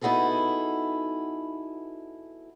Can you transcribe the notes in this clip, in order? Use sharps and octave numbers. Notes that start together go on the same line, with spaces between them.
B3 D#4 E4 F#4 G#4 A4